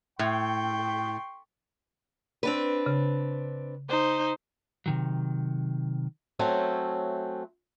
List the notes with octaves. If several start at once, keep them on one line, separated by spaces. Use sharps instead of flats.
A2 G5 C6 C#6
C4 D4 B4
C#3
D#4 C5
C3 D#3 F#3
F#3 A3 C4 C#4